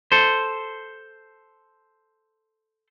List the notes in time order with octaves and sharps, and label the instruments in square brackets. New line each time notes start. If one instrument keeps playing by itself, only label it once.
[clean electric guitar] A4 C5